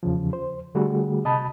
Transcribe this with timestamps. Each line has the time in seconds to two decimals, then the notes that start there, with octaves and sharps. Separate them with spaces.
0.03 E2 C#3 F3
0.33 C5
0.75 D3 G3 A3 F#4 G#4
1.25 C3 D#5 A5 B5